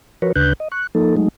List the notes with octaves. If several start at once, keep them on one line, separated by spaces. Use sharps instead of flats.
F3 F#4 A#4 B4 C#5
D2 C#3 D4 B4 F#6 G6
D#5
C#6 F#6
F3 A#3 D#4 A4
F#3 G#3 A3 D#4